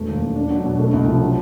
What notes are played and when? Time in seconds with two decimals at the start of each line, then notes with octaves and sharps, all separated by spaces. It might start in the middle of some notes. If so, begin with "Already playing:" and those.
Already playing: E1 A3
0.08 D#2
0.21 E1
0.36 D4
0.50 F#3
0.65 B2
0.79 A3
0.93 C2
1.07 F3
1.22 F#3